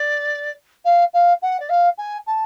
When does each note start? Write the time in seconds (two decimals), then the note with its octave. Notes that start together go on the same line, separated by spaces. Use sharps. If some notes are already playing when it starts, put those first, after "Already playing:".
Already playing: D5
0.85 F5
1.14 F5
1.42 F#5
1.60 D5
1.69 F5
1.98 G#5
2.27 A5